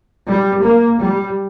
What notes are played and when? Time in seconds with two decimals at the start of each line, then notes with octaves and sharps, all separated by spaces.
0.26 G3
0.63 A#3
1.00 G3